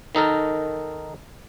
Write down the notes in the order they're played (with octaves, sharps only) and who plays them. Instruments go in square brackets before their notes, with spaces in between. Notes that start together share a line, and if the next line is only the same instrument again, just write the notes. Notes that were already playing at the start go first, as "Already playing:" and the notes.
[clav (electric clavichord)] D#3 D#4 A4 A#4